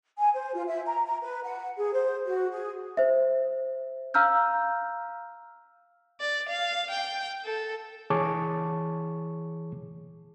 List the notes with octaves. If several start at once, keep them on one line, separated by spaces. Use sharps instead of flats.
G#5
C5
F4
E5
A#5
A#5
B4
F#5
G#4
C5
F#4
G#4
C5 E5
F5 A#5 E6 F6 G6
D5
F5
G5
A4
E3 G#4 C#5 A5 C#6 D6